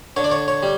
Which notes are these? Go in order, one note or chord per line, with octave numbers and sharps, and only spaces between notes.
D3 C#5
D5
C#5
C#5
G3